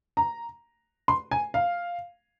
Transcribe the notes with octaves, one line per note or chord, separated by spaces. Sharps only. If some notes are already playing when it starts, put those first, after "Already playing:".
A#5
C6
G#5
F5